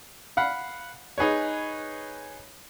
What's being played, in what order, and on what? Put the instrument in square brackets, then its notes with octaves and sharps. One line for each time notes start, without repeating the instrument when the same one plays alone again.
[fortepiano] F5 F#5 B5
D#4 G#4 B4 C#5